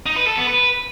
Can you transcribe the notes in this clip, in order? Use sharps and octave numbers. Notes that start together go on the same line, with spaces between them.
D#4
B4
A4
B3
B4